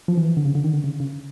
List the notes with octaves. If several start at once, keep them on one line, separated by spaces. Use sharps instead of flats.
F3
E3
D3
C#3
D3
D#3
D3
C#3
C#3